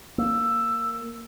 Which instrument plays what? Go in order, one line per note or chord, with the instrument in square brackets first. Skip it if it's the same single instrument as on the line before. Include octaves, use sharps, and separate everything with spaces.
[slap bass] A#3 [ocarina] E6